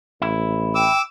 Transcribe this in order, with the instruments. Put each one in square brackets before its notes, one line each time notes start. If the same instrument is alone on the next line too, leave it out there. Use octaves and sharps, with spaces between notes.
[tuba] A1 [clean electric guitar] E4
[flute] G5 [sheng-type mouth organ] D6 E6